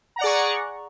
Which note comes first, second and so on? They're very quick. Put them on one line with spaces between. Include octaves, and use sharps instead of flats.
A#5 F#5 D5 G#4 C#6